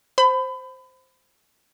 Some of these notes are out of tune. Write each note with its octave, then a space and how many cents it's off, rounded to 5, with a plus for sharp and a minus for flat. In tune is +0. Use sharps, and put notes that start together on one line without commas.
C5 +0 B5 +30